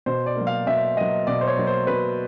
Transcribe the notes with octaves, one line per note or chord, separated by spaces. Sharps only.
B2 C5
D5
F#3 A#3
F5
B2 E5
F#3 A#3 D#5
B2 D5
C5
C#5
F#3 A#3
C5
B2 B4